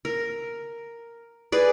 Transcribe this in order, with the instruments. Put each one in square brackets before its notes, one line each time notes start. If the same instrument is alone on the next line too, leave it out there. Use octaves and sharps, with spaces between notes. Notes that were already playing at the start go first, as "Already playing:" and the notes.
[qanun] A#4
G#4 B4 D5